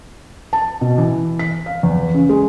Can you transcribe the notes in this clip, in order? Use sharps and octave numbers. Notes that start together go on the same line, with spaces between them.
A5
B2
E3
B6
F5
E2
C#3
G#3